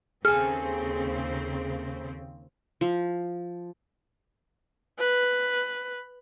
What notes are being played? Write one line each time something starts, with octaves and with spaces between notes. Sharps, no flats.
D#2 C#3 C4 G#4 A4 G#5 F6
F3
B4